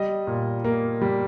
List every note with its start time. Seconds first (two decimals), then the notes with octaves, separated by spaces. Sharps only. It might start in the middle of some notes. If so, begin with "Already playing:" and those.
Already playing: G3 D#5
0.27 A#2
0.65 A#3
1.01 G3